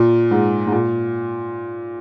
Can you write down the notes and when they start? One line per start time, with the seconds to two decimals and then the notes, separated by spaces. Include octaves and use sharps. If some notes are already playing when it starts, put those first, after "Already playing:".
Already playing: A#2
0.31 G#2
0.67 G#2
0.72 A#2